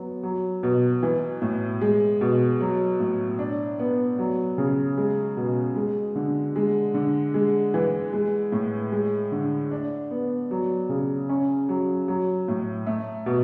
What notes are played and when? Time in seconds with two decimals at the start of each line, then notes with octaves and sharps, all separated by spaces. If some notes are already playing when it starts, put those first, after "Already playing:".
Already playing: F#3 B3
0.23 F#3
0.63 B2
1.03 E3
1.42 A2
1.81 G#3
2.21 B2
2.61 F#3
3.00 A2
3.39 D4
3.79 B3
4.19 F#3
4.58 C#3
4.97 G#3
5.37 B2
5.76 G#3
6.16 D3
6.56 G#3
6.94 D3
7.34 G#3
7.74 E3
8.13 G#3
8.52 A2
8.92 G#3
9.32 D3
9.71 D4
10.11 B3
10.51 F#3
10.89 C#3
11.29 C#4
11.69 F#3
12.08 F#3
12.48 A2
12.87 A3
13.26 B2